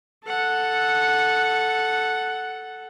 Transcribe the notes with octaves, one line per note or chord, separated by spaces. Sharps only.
A4 F#5